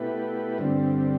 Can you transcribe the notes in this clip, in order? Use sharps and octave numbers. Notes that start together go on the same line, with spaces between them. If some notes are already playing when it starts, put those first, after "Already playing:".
Already playing: B2 A3 E4 G4 B4
G2 D3 G3 C4